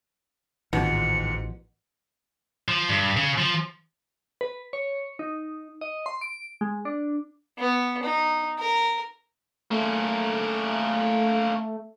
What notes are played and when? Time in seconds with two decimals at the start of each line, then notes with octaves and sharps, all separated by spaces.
0.73 A1 D#2 G#2 B2 F3 C#7
2.69 F3
2.89 G2
3.17 C#3
3.38 F3
4.41 B4
4.73 C#5
5.19 D#4
5.81 D#5
6.06 C6
6.21 D7
6.61 G#3
6.85 D4
7.58 B3
8.03 D#4
8.59 A#4
9.71 A3 A#3 C#4